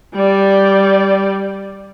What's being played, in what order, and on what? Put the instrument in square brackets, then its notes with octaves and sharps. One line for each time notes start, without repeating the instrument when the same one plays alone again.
[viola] G3 D5